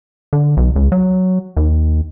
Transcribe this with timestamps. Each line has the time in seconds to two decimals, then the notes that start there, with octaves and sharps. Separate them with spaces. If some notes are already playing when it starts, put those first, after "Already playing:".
0.33 D3
0.57 B1
0.76 C#2
0.92 F#3
1.57 D#2